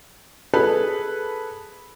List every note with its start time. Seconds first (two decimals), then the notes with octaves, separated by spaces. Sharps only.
0.54 G#4 A4 B4